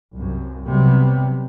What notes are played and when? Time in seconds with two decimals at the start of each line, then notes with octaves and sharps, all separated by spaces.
0.16 C2 F#2
0.68 C3 F#3 G3 B3